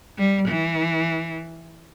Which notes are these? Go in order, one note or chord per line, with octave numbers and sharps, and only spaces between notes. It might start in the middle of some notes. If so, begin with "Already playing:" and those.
G3
E3